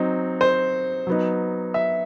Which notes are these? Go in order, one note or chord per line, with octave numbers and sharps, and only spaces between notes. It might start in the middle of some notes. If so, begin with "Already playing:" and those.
Already playing: F#3 C4 D#4
C5
F#3 B3 D#4
E5